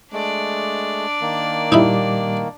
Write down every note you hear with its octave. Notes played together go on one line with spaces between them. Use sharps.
G#3 A3 D4 D5
D#3 A#3
A#2 G3 D#4 E4 B5